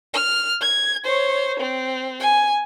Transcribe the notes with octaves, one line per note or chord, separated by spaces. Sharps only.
F6
G#6
C5 C#5
C4
G#5